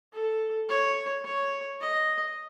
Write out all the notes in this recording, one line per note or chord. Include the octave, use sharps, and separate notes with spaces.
A4
C#5
C#5
D#5